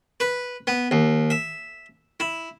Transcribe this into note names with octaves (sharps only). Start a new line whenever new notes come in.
B4
B3
D#2
E5
E4